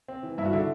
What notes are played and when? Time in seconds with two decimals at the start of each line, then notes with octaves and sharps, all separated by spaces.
0.08 C4
0.23 E3
0.38 G2 E4
0.45 F#4
0.53 D3 E4